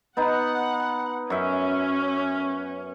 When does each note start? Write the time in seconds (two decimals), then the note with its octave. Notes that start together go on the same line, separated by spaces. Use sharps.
0.17 B3 D#4 F#5
1.30 F#2 C#4 E5